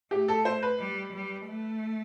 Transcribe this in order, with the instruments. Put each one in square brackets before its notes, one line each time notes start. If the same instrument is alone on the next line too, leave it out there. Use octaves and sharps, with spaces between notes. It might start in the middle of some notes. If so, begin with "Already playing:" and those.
[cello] A3 [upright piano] G4
[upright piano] A4
C5
B4
[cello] G3
G3
A3